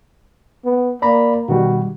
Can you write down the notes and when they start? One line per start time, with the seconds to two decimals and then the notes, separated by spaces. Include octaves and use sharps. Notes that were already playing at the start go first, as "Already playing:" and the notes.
0.65 B3
1.02 A#3 D5 A#5 B5
1.49 B2 D#3 G3 F#4